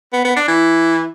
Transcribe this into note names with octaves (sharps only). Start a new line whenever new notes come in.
B3
B3
D4
E3